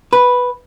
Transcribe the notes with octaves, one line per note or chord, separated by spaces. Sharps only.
B4